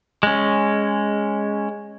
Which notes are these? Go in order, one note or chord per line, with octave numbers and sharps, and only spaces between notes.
G#3 C#4